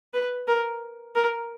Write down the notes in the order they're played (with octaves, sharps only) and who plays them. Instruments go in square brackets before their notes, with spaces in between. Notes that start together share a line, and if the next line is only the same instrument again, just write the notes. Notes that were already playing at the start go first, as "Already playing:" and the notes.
[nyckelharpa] B4
A#4
A#4